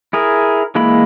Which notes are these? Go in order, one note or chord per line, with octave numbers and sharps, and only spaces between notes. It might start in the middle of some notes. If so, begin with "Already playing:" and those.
E4 G#4 A#4
E3 G#3 A#3 E4 B5